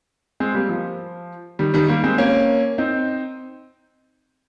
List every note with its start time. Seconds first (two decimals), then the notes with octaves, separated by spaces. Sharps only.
0.40 G#3 C4
0.55 G3 A#3
0.69 F3
1.59 D#3 G3
1.74 D#3 G3
1.88 G3 A#3
2.04 G#3 C4
2.18 A#3 C#4
2.78 C4 D#4